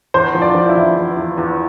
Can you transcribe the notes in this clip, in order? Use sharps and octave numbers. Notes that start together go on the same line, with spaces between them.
E2 C5
F3
D5
F3
E4
E2
E2
E2
E2